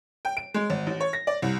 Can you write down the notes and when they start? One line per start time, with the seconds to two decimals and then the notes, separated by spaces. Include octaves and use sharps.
0.25 G5
0.37 D7
0.54 G#3
0.70 G#1
0.87 A1
1.00 C#5
1.13 A#6
1.27 D5
1.42 C2